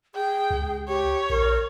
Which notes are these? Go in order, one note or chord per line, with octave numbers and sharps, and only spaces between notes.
G#4 G5
C#2
G4 C#5
A#1 A#4